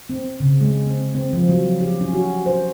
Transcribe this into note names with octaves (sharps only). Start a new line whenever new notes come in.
C4
C#3
G#3
C4
C4
F3
F#3
G4
C#4
F#4
C5